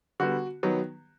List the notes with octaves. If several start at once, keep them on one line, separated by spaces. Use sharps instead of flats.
D3 G3 B3 F#4
D#3 F#3 B3